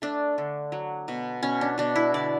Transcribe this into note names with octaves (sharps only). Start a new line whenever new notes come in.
A3 D4
D3
F#3
B2
B2 C#4
D4
B2 D4
E4
D3 D5